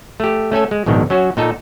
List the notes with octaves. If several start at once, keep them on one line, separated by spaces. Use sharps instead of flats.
A3 G4
A3 C#4 A4 G#5
G#3
A#1 G#2 B2 D#3
F#3 C#4 F#4
A#2 D#4 A4